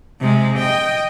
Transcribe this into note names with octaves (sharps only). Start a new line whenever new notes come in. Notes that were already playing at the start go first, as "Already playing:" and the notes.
C3 G#3
D#5 G5